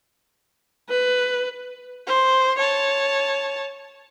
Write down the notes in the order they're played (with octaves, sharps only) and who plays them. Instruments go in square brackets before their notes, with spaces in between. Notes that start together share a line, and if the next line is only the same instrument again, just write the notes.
[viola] B4
[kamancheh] C5
C#5 A5